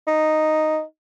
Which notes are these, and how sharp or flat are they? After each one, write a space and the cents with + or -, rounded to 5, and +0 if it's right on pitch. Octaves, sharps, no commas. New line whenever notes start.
D#4 -5